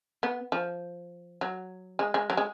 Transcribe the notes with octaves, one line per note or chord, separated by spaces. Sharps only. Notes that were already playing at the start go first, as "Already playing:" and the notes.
B3
F3
F#3
G#3
G#3
F#3
G#3